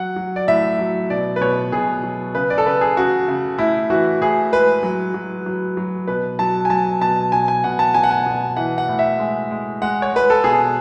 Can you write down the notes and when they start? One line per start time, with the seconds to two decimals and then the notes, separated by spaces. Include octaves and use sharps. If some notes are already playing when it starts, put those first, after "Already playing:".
Already playing: F#3 F#5
0.16 F#3
0.36 D5
0.48 A2 E5
0.79 F#3
1.10 B2 D5
1.36 B4
1.41 B2 C#5
1.72 B2 G#4
2.03 F#3
2.35 C#3 B4
2.50 D5
2.58 A4
2.66 C#3 B4
2.81 G#4
2.97 C#3 F#4
3.28 C#3
3.58 A2 E4
3.90 E3 F#4
4.21 A2 G#4
4.52 G#3 B4
4.83 F#3
5.14 F#3
5.46 F#3
5.77 F#3
6.07 B2 B4
6.39 F#3 A5
6.65 G#5
6.70 F#3 A5
7.01 B2 A5
7.32 B2 G#5
7.48 G#5
7.64 B2 F#5
7.79 A5
7.94 B2 G#5
8.03 F#5
8.11 G#5
8.26 B2
8.57 E3 F#5
8.78 F#5
8.88 A2
8.99 E5
9.19 G#3
9.51 G#3
9.82 G#3 F#5
10.02 C#5
10.13 G#3 B4
10.30 A4
10.44 B2 G#4